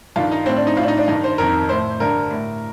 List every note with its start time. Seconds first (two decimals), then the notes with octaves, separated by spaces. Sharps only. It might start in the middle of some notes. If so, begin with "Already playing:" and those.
0.16 G2 D#3 F4
0.31 D#4
0.46 A2 C4
0.57 D4
0.67 D#4
0.77 A2 F4
0.83 D4
0.88 D#4
0.98 D4
1.08 G2 D#3 D#4
1.24 C5
1.38 F2 D#3 A#4
1.69 A2 C5
2.00 G2 D3 A#4
2.30 A2